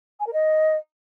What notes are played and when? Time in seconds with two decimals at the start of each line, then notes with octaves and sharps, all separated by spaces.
0.20 G#5
0.27 A#4
0.33 D#5